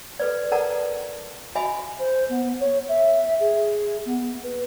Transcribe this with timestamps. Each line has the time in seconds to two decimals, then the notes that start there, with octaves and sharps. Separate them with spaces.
0.20 A4 B4 D5
0.52 A4 A#4 D5 F#5 A5 A#5
1.55 F#4 D#5 E5 G#5 B5
1.99 C5
2.29 B3
2.60 C#5
2.89 E5
3.40 G#4
4.06 B3
4.44 B4